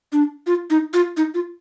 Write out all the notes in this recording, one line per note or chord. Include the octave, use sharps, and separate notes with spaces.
D4
F4
D#4
F4
D#4
F4